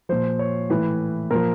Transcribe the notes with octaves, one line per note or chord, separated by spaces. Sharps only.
A#2 F3 C5
C#5
A2 E3 B4
A#2 F3 A#4